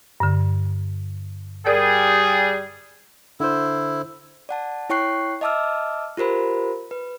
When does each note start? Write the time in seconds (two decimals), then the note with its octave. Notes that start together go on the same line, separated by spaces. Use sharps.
0.20 G2 D3
1.66 G3 G#4 A#4 D5
3.40 D3 E4 C5
4.49 D5 F#5 A5
4.90 E4 C#5 G5 C#6 F#6 C7
5.41 D#5 E5 A5 D6 E6 F6
6.17 F4 G4 A#4 C5 B5
6.91 B4